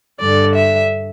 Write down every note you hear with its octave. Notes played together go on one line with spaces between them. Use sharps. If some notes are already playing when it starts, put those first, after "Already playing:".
G2 D3 D5
E5